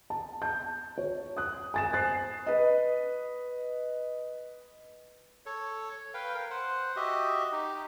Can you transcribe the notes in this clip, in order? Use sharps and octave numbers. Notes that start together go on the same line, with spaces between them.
A5
A5 G6
C#5
D#6 F#6
G#5 A6 E7
C5 F#6 A6 C7
B4 D#5
A4 C#5
B4 F5 G5
A#4
C5 F#5
F#4 G4 D#5 E5
D#4 G4